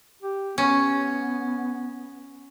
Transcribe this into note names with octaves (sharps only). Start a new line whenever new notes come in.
G4
B3 C#4